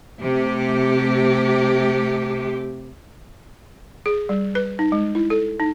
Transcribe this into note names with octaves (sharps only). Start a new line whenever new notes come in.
C3 A3 G4
G#4
G3
B4
D#4
G#3
E4
A4
D#4